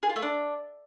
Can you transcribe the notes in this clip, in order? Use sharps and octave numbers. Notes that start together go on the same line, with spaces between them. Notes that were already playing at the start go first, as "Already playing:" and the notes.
G#4
F4
A3
D4